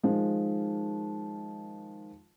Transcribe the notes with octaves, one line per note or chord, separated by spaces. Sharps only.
D#3 F3 G#3